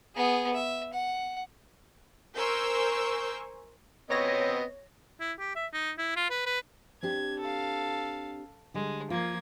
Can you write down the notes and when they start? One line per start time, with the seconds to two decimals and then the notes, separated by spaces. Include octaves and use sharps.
0.15 B3 G#4
0.54 E5
0.93 F#5
2.36 A#4 C5 G#5 C#6 E6 G6
4.10 B3 C4 C#5 D#5 A#6
5.20 E4
5.39 G4
5.56 E5
5.73 D#4
5.98 E4
6.16 F4
6.30 B4
6.46 B4
7.03 C4 D4 G4 G#6
7.39 A4 F5
8.74 D3 G3 G#3
9.10 F3 A#3 F4 G#6